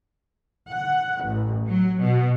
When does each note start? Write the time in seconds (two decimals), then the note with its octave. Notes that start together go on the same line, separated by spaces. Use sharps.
0.71 F#5
1.24 A1
1.67 F#3
2.01 B2